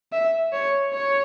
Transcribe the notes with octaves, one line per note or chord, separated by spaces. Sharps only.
E5
C#5
C#5